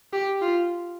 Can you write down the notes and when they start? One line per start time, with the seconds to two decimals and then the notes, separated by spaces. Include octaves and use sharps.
0.13 G4
0.42 F4